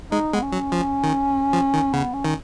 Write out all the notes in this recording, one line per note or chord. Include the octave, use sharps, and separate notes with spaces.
G#3 D#4
G#3 B3
C#4
F#3
F3
D#3
F3
D#3
C#3 B3
C#4
D#3